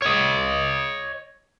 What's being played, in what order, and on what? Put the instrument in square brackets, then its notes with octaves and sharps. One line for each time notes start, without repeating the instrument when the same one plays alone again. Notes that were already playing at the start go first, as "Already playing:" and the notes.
[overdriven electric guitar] C#5 D#5